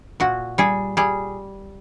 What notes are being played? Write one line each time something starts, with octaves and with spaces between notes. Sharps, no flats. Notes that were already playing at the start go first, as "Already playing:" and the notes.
A#2 F#4
G3 G#4
G3 G#4